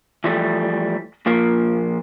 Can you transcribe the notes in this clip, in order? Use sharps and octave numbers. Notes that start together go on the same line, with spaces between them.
E3 F3 G3 A3
A#2 F3 A#3